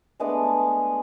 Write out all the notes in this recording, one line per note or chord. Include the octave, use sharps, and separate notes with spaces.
G#3 A3 B3 D4